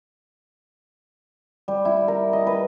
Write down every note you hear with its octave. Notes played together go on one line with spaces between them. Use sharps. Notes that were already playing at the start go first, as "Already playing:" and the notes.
G3
E4
A#4
D#5
B4